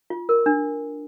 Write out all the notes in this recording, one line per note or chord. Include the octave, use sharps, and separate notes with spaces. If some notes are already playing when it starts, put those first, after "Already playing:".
F4
A#4
D4